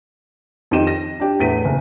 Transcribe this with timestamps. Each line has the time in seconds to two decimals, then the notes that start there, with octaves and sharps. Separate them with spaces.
0.71 F2 D#3 D#4 G4 D#7 E7
0.87 A#6
1.20 D4 G4
1.39 E2 A2 B6 D#7
1.65 F#1